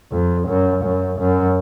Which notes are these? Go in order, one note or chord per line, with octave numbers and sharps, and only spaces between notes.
F2
F#2
F#2
F#2